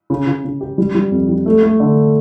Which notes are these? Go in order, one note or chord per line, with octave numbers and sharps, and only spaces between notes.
C#3
C#3
C#3
G4
G3
G3
F2
G3
A3
A3
D3